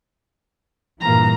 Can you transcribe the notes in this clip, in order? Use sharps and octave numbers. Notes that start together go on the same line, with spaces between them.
G2 A#2 E3 A#3 A#5